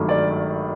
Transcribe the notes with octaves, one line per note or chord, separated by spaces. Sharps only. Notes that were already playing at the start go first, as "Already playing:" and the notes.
Already playing: G#1 G2 D#3 F#3 A3
D5